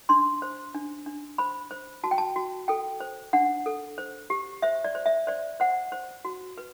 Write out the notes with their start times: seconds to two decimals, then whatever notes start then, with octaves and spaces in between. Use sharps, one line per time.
0.09 D4 C6
0.42 C5
0.75 D4
1.06 D4
1.38 C5 B5
1.71 C5
2.04 F#4 A5
2.11 G5
2.18 A5
2.36 F#4
2.68 A4 G5
3.00 C5
3.33 D4 F#5
3.66 A4
3.98 C5
4.30 G4
4.62 C5 E5
4.84 D5
4.95 C5
5.06 E5
5.27 C5 D5
5.60 C5 F#5
5.92 C5
6.25 F#4
6.58 B4